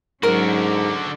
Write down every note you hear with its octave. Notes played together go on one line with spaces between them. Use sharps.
G#2 D3 F#3 C#4 F#4 A#4